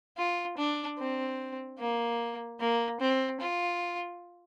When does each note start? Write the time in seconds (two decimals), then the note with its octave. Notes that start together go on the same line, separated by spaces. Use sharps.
0.17 F4
0.57 D4
0.98 C4
1.79 A#3
2.60 A#3
3.00 C4
3.41 F4